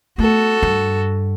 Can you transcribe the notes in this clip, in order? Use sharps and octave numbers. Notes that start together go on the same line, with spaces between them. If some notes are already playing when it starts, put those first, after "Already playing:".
A3 B3 F#4 A4
G2